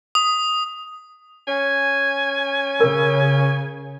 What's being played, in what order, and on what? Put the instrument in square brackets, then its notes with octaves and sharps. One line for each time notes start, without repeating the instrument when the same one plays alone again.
[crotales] D#6
[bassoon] C#4 [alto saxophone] G#5
[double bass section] C#3 [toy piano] A#4